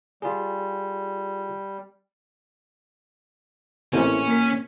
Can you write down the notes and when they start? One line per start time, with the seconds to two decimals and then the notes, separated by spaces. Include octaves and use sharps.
0.22 G3 F4 G#4
3.93 A1 A#2 E3 A3 C4 C#4 C#5
4.27 A#3 B6